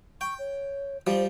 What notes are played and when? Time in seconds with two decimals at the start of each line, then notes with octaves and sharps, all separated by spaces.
0.21 G5 C#6
0.39 C#5
1.07 F3 G3 C5